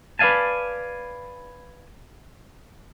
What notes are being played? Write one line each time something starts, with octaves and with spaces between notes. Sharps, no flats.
B4 D5 E5 F5 G#5 A5